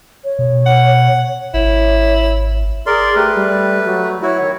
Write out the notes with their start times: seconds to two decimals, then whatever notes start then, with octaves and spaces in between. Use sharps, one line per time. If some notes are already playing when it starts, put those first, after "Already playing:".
0.24 C#5
0.39 B2
0.66 F#5
1.54 G#1 E4 C#5
2.86 G#4 A#4 D5 C6
3.16 A3 G4 B4
3.35 G3
3.86 F#3
4.22 E4 F#4 C#5
4.41 D#3